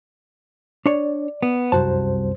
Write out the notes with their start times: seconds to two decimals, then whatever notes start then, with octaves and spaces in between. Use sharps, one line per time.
0.86 D4 C#5 D5
1.42 B3
1.72 C2 F#2 F#4 C5 A5